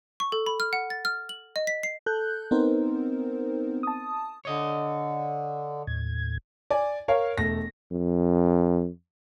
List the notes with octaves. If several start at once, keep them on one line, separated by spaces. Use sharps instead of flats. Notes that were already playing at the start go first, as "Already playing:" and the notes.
C#6
A4
B5
F6
F#5
A6
F6
F#7
D#5
B6
C7
A4 F#6 G6
B3 C4 D#4 A#4 C5
A5 D#6
D3 C#5 D#5
D#2 A2 G#6
D5 G#5
A#4 C#5 F5
E1 A3 A#6
F2